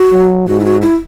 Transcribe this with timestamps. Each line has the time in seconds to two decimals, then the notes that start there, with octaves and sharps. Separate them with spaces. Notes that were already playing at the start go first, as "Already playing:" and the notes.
Already playing: F#4
0.12 F#3
0.47 G#2 F#4
0.60 E4
0.65 F#4
0.82 E4